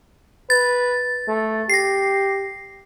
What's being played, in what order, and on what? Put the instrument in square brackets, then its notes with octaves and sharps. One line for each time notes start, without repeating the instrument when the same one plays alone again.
[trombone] B4 [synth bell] A6
[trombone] A3
[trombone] G4 [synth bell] A#6 C7